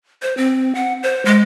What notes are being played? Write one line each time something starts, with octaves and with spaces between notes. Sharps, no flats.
C5
C4
F#5
C5
G#3